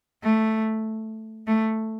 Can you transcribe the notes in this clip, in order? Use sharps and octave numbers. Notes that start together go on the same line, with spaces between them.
A3
A3